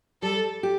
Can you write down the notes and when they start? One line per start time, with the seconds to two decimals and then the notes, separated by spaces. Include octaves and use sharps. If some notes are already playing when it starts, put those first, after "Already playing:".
0.22 G3 A4
0.63 G4